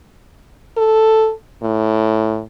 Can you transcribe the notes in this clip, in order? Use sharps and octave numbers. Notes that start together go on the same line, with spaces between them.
A4
A2